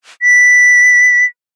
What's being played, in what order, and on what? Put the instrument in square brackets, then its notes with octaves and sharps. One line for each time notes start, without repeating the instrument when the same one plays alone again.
[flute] B6